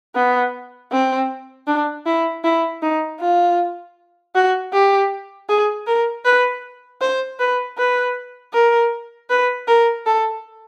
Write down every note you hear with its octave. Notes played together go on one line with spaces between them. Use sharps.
B3
C4
D4
E4
E4
D#4
F4
F#4
G4
G#4
A#4
B4
C5
B4
B4
A#4
B4
A#4
A4